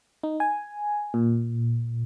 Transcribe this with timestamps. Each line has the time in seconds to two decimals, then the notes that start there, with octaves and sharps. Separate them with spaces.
0.23 D#4
0.40 G#5
1.14 A#2